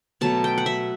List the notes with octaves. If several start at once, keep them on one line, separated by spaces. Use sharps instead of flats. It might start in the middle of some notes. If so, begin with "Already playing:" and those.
B2 F#3 A3 A5
G5
F#5
E5